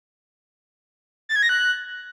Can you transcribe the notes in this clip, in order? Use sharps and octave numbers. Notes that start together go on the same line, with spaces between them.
A6
G#6
A#6
F#6